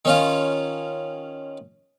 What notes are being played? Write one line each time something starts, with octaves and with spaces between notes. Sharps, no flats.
D#3 C#4 F4